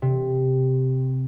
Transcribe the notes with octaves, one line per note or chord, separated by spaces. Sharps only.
C3